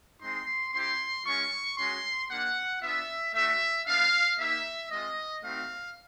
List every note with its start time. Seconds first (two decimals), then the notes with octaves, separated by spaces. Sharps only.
0.22 G#3 C4 D#4 C6
0.73 C4 E4 G4 C6
1.26 G#3 C#4 F4 C#6
1.78 G#3 C#4 F#4 C6
2.30 A#3 D4 G4 F#5
2.82 B3 D4 F4 E5
3.34 A3 D4 F#4 E5
3.86 G3 B3 D4 F5
4.39 A#3 D#4 G4 E5
4.90 G#3 C4 F4 D#5
5.43 A3 C4 D#4 F#4 F5